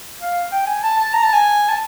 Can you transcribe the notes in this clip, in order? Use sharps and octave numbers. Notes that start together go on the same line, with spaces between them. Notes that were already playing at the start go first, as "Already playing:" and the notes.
F5
G5
G#5
A5
A5
A#5
A5
G#5
A5